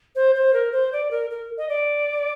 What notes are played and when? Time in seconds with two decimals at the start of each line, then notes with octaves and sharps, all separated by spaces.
0.15 C5
0.35 C5
0.53 A#4
0.72 C5
0.92 D5
1.11 A#4
1.30 A#4
1.57 D#5
1.69 D5